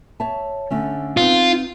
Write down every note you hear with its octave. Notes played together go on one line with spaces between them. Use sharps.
C#5 E5 A5
D3 A3 C#4
B3 C4 D#4 F4